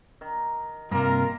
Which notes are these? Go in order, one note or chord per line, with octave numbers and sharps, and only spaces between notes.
D#3
G2 C3 A#3 F4 A#4 A#5